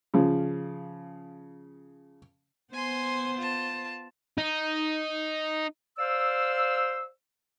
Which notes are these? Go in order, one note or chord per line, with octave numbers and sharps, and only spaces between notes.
C#3 F3
B3 C5 G#5 C6
F4 A5
D#4
C5 D5 F5 E6